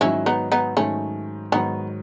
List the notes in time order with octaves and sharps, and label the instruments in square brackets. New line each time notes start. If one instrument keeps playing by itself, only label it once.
[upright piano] G#2 D#3 F#3 [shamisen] C#4 E4
[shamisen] B3 D#4
B3 D#4
[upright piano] G#2 D#3 F#3 [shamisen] A3 C#4
[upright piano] G#2 D#3 F#3 [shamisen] B3 D#4